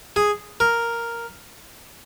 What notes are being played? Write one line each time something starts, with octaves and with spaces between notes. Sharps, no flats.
G#4
A#4